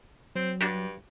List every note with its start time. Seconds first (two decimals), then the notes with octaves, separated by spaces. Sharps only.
0.35 F#3 C4
0.61 G2 D4 F#4 G4